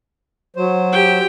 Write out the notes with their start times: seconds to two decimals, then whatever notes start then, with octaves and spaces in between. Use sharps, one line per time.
0.56 F#3 C5
0.92 G4 G5